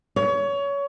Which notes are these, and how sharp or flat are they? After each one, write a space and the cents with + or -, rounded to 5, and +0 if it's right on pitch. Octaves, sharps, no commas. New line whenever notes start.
C#5 +25